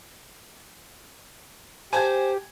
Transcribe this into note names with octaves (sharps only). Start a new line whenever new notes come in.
G4 C5 G#5 A5 G#6